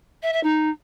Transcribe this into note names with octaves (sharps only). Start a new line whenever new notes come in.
E5
E5
D#4